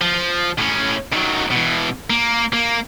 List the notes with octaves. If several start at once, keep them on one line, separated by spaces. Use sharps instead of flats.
F3
A2 C#4
D#3 F#3
B2 E3
A#3
A#3